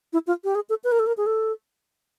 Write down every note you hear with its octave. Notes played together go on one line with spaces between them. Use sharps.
E4
F4
G4
G#4
A4
B4
A#4
A4
A#4
G#4
A4